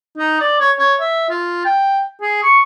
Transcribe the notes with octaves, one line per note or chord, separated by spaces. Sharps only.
D#4
D5
C#5
C#5
E5
F4
G5
G#4
C#6